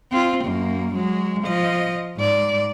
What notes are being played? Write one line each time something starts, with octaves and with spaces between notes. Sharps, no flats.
C4 F4
F#2 A#3
F#3 G#3
F3 D#5
G#2 D5